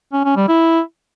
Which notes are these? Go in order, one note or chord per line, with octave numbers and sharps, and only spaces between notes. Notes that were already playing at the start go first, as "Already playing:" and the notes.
C#4
C#4
G3
E4